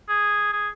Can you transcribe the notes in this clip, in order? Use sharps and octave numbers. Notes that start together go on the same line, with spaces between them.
G#4
G#4